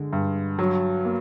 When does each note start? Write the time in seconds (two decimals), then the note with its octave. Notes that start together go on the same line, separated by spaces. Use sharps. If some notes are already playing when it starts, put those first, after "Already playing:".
Already playing: D3 G#3
0.13 G2
0.59 F#3
1.05 A#3